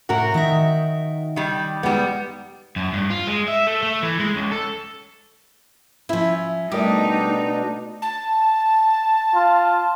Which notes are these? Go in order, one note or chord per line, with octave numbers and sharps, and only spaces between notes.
A2 F#4 A#4
D#3 D#4 E5
D#3 G3
G3 G#3 B3 D#4
F#2
G2
F4
G#3
E5
A3
A3
E3
G#3
C#2
A4
F3 C#4 E4 E5
B2 G3 A3 D4 D#4 G4 A#4 D#5
A5
F4